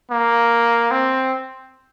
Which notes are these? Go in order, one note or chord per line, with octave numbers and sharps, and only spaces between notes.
A#3
C4